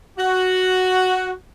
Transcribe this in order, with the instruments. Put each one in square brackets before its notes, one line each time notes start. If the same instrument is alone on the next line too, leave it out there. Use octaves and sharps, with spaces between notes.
[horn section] F#4